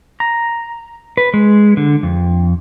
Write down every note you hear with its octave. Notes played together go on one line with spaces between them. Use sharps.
A#5
B4
G#3
D3
F2